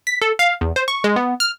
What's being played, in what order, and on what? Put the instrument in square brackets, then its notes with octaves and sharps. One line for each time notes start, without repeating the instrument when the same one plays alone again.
[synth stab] B6
A4
F5
E2
C5
C#6
G#3
B3
F6